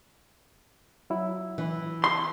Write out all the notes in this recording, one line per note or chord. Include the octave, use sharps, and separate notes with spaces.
F#3 E4
E3
C6